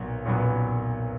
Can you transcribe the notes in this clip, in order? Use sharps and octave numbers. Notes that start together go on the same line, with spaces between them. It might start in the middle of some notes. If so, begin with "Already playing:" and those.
Already playing: B1 A#2 F#3 B3
B1 A#2 F#3 B3